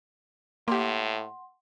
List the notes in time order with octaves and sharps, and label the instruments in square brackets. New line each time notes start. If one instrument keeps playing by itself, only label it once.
[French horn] A2 [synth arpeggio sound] A#3 G4 [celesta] F#5 C6